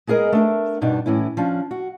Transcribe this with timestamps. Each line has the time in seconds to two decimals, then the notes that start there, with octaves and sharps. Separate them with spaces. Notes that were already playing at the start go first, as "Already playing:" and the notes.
0.07 G#3 B3 G#4 A#4 D#5
0.33 A3 D4 A#4
0.81 G2 B2 D4 D#4
1.06 A2 E3 C#4 E4
1.37 F3 C#4 D4
1.71 F#4